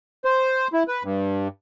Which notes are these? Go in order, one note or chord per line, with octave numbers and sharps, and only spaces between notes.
C5
E4
B4
G2